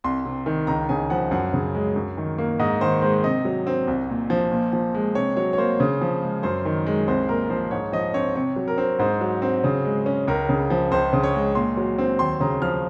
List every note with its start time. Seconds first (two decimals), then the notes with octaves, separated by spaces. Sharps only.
0.04 C2 C6
0.25 C3
0.46 D#3
0.67 C#2 A#5
0.89 C#3 G#5
1.10 F3 F#5
1.31 F#2 F#5
1.53 C#3
1.74 G#3
1.96 F#2
2.17 D#3
2.38 A#3
2.59 G#2 D#5
2.81 D#3 C5
3.02 G#3 C5
3.24 C3 D#5
3.45 F#3
3.67 C4
3.87 C2
4.09 A#2
4.30 F3
4.51 A#2
4.73 F3
4.95 G#3
5.15 C3 C#5
5.37 F#3 C#5
5.53 C#5
5.58 A#3 C5
5.80 C#3
6.01 F3
6.23 G#3
6.43 F#2 C5
6.65 D#3
6.86 G#3
7.07 C2 C5
7.29 A#2 A#4
7.50 F3 C5
7.71 G#2 C#5
7.92 F3 D#5
8.14 C4 C#5
8.36 C3 C#5
8.56 F#3
8.68 A#4
8.78 C4
8.99 G#2 C5
9.21 F#3
9.42 C4
9.64 C#3
9.85 G#3
10.06 C#4
10.27 C#2 A#4
10.49 C#3
10.70 F3
10.91 C#2 C5
11.13 C#3
11.23 C#5
11.34 G#3
11.55 A#2 C6
11.77 F#3
11.98 C4
12.19 D#2 C6
12.40 C#3 A#5
12.62 F3 F6